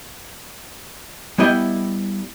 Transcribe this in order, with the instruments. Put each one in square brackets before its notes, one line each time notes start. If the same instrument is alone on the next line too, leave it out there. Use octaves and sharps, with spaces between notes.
[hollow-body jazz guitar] G3 B3 E4 D#5 G5